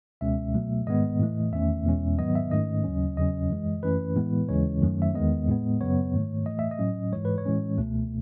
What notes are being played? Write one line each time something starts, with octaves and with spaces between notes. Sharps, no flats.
C#2 B2 G#3 C#4 E5
B2 F#3 A3
G#2 D#3 G#3 B3 D#5
A2 E3 A3
E2 D#3 A3 C#4 E5
E2 B2 G#3 C#4
G#2 D#3 F#3 B3 D#5
E5
G#2 D#3 A3 C#4 D#5
D#2 C#3 F#3 C#4
E2 C#3 F#3 C#4 D#5
F#2 E3 G#3
F#2 E3 A3 C#4 B4
A2 E3 G#3 B3
D#2 C#3 E3 G#3 C#4 C#5
F#2 D#3 F#3 A3 C#4
E5
E2 D#3 G#3 B3 D#5
A2 G#3 B3
F#2 C#3 F#3 B3 C#5
G#2 D#3 A3
A2 E3 A3 D#5
E5
D#5
A2 F#3 C#4
G#2 E3 G#3 C#5
B4
C#5
A2 E3 G#3 C#4
C#2 B2 A3